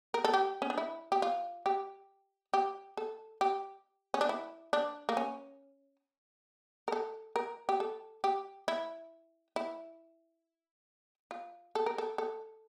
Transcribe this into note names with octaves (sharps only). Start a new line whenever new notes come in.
A#4
A4
G4
C#4
D4
E4
G4
F4
G4
G4
A4
G4
C#4
D4
E4
D4
A#3
C#4
A#4
A4
A#4
G4
A4
G4
E4
E4
F4
A4
A#4
A4
A4